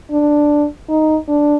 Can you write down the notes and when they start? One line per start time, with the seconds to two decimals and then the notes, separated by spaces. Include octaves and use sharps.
0.10 D4
0.89 D#4
1.28 D4